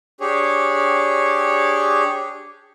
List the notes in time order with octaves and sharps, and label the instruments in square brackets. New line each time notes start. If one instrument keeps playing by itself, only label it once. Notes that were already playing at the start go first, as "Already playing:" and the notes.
[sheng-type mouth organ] D4 G4 G#4 C#5